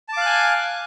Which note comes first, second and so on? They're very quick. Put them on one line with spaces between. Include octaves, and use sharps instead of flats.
A5 D6 F5 F#6 G#5